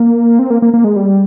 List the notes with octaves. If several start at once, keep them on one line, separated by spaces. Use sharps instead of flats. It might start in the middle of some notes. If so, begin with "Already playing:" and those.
Already playing: A#3
C4
A#3
A#3
A#3
G#3
G3